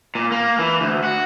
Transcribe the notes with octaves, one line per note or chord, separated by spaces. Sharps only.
A#2
A#3
E3
D2
F#4